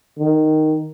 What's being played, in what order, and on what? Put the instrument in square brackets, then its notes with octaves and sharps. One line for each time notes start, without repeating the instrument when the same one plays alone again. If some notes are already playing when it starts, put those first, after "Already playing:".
[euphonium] D#3